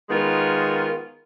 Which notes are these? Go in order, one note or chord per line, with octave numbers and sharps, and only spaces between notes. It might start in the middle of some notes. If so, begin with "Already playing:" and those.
D#3 G#3 B3 F4 A#4